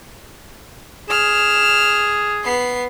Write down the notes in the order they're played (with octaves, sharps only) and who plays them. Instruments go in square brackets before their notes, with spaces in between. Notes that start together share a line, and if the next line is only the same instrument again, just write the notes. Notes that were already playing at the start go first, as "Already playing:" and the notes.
[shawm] G#4 [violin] F6 E7
[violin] B3 C7